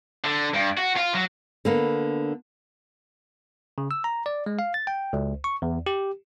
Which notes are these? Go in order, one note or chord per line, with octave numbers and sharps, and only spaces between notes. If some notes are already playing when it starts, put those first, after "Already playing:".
D3
G2
F#4
F4
F#3
D3 A#3 B3
C#3
E6
A#5
D5
G#3
F5
A6
G5
C#2
C#6
E2
G4